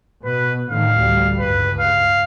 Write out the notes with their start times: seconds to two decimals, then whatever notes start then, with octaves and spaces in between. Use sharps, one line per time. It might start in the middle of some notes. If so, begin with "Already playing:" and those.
0.25 B2 B4
0.70 A2 D3 D#3 F5
1.00 A1 D2 G3
1.39 C#2 G2 B4
1.80 F5